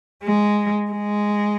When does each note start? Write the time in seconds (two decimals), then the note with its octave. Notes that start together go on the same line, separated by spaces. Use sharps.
0.24 G#3
0.91 G#3